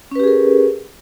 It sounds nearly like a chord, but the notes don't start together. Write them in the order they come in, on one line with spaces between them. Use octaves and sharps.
C#4 B4 G4 G#4 A#4